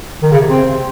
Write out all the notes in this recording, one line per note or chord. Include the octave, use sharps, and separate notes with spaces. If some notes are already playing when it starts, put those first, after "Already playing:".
D#3
C#3
C3
C4